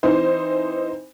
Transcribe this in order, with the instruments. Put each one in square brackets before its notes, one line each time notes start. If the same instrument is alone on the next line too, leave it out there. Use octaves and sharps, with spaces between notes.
[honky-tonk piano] E3 C4 D#4 C5